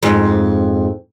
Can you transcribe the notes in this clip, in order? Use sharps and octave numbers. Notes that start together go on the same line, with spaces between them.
F2 G#2